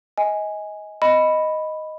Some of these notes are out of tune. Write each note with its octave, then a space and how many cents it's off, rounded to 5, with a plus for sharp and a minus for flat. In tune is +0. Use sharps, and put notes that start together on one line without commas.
D#5 +25 G#5 -5
D#5 +0 B5 +0